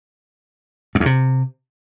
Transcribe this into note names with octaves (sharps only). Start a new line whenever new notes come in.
F#2
E2
C3